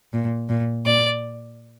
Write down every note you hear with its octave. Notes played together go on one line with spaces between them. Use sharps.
A#2
A#2
A#2 D5